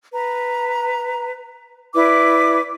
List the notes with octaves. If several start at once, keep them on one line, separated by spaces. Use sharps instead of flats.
B4 A#5
E4 B4 D5 D6